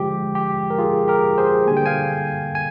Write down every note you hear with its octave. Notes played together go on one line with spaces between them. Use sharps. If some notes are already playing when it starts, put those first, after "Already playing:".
Already playing: D3 F3 G#3 G4
G4
A#4
F4 G#4
G4 A#4
G#4 C5
D3 G3 A#3 G#5
G5
F5 G#5
G#5